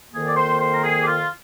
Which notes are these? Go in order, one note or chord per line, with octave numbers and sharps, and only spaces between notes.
F2 D#3 A#3 G#4
D5
C5
C5
A#4
G#4
G4
F4